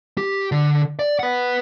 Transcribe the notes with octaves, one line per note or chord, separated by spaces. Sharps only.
G4
D3
D5
B4 F#5